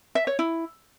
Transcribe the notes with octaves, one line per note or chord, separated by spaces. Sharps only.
E5
C#5
E4